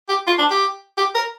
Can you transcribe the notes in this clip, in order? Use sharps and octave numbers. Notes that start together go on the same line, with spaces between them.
G4
F4
D4
G4
G4
A#4